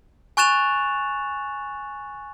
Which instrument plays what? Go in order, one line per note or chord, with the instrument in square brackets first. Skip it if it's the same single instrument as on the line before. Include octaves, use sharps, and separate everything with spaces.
[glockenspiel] G#5 C#6 F#6 A6 E7 F7